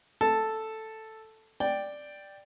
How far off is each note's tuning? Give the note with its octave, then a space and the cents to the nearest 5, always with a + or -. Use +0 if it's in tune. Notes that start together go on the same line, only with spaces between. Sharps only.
A4 +0 A5 +0
D5 +5 G5 +0